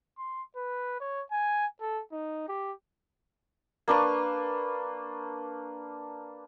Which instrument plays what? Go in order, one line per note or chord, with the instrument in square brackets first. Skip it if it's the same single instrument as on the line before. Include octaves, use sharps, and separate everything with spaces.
[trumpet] C6
B4
C#5
G#5
A4
D#4
G4
[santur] A#3 D4 B4 C#6